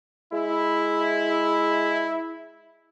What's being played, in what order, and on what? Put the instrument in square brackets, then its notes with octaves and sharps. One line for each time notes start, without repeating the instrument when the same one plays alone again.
[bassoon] G#3 [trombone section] E4